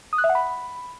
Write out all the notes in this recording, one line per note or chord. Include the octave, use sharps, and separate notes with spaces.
D#6
F#6
E5
F#5
B5